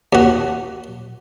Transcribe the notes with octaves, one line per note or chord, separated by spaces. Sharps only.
D#2 F#4